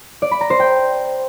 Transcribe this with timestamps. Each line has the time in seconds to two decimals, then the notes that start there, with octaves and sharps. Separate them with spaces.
0.22 D5
0.31 B5
0.41 A#5
0.50 C5
0.60 G5